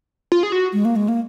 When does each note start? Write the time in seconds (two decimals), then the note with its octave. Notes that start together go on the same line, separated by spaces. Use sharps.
0.32 F4
0.43 G#4
0.52 F#4
0.73 G#3
0.85 A#3
0.96 G#3
1.09 A#3